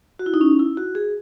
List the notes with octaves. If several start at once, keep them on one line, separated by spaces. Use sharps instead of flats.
F#4
E4
D#4
C#4
E4
F#4
G#4